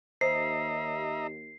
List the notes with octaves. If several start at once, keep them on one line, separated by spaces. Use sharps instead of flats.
D#2 C5 D#5 E5 A#5 C7